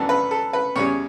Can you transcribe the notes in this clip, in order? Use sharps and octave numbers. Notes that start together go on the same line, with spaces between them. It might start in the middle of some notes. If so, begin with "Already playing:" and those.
Already playing: F#2 E3 B3 D4 A4
B4
A4
B4
E2 C#3 G3 C#4 C#5